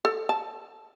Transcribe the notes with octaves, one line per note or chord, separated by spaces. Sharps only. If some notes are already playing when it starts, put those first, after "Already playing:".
A4
A5